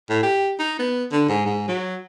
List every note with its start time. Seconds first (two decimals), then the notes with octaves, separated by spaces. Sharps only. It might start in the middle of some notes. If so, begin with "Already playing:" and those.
0.10 A2
0.23 G4
0.59 D#4
0.79 B3
1.12 D3
1.29 G#2
1.46 G#2
1.68 F#3